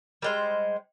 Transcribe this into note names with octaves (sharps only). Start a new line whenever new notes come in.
G3 G#3 C5